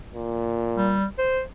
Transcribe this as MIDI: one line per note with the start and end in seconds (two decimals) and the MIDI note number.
0.14 0.99 46
0.78 1.05 55
1.19 1.42 72